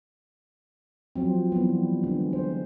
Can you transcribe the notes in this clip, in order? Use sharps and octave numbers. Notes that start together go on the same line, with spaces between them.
F3 F#3 C4
E3 G3 B3
D3 G#3
C5